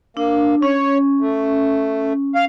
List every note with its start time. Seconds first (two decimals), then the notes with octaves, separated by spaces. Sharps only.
0.17 A#3 D4
0.62 C#4 C#5
1.21 A3
2.35 F5